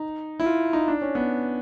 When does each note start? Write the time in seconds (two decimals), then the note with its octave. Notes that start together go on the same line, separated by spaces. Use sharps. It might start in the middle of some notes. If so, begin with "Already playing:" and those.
Already playing: D#4
0.40 E4
0.46 F4
0.73 D#4
0.88 D4
1.02 C#4
1.15 B3